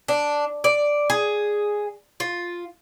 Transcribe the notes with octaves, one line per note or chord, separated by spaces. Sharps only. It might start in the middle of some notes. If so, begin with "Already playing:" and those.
D4
D5
G#4
F4